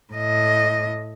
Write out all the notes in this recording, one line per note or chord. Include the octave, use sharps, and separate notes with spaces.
A2 D#5